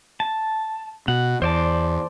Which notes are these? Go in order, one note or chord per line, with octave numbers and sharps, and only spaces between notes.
A5
B2 F#5
E2 C5 D5 A5